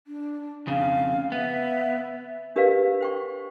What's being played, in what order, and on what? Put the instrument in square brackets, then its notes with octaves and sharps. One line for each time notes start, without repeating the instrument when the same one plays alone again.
[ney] D4
[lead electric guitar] F2 C#3 [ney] F5
[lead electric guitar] B3 [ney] E5
[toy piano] D4 G4 A#4 B4 D5 F5
C5 G5 C#6